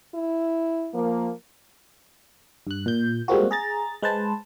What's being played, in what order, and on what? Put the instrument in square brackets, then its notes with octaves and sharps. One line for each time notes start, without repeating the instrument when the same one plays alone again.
[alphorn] E4
[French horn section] F3 A#3
[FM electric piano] G2 F#6
A#2 G6
G3 G#3 A#3 C4 F4 F#4
G#4 A#5 A6
G#3 B4 C5 A5